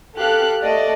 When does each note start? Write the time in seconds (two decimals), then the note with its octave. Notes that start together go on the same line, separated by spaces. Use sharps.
0.16 G4 A4 F5 F#6
0.62 A3 D5 D#5